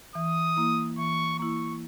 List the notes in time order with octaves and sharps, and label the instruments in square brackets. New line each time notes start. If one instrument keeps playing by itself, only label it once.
[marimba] E3 [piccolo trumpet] D#6
[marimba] A#3 E4
[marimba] E3 [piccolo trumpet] C#6
[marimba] A#3 E4 [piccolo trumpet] C#6